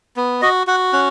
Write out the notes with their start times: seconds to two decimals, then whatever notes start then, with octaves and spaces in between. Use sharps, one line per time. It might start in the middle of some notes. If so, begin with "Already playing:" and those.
0.16 B3
0.42 F#4 D#5
0.67 F#4 F#5
0.93 C#4 F#5